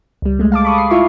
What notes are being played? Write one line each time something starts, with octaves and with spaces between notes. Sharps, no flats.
C#2 G3
G#3 A3
F5 A5 D6
B5 C#6 D#6
C7
E4 F4 E5 C#6